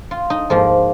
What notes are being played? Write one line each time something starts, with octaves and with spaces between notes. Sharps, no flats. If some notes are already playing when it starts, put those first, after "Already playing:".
F4
D#4
G#2 F3 A#3 F4